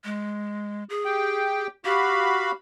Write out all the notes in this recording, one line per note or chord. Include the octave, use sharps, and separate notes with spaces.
G#3
G#4
G4 G5
F#4 G4 F5 B5